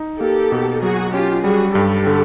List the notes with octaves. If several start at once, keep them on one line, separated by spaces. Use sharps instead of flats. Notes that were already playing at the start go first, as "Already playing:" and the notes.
Already playing: D#4
A#3 G4 A4
B2
F#3 F#4 G#4
C#4 F4 G4
G3 F#4 G#4
G2 G4 A4
D3